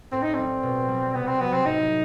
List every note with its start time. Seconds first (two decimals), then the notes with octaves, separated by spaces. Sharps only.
0.12 A2 C4
0.22 D#4
0.34 G3 C4
0.63 B2
0.88 G3
1.15 C3 B3
1.27 C4
1.40 F#3 B3
1.53 C4
1.65 A2 D#4